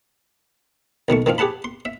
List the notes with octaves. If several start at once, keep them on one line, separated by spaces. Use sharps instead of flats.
B1 D#3 A3 C#6
D#3 F3 C4 F5
G4 G#4 F#5 A5 B5
C6
E5